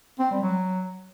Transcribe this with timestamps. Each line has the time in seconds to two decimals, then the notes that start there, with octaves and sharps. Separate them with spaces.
0.19 C4
0.31 G3
0.42 F#3